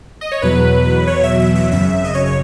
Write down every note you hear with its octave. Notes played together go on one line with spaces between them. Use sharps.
D#5
C#5
E2 B2 F#3 B4
C#5
E5
E5
E5
G#1 F#2 C#3 E5
D#5
C#5
C#5